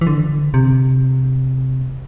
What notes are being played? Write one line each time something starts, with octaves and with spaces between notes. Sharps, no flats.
E3
D3
C3